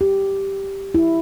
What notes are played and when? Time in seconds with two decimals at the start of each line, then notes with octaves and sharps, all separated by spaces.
0.01 G4
0.94 E4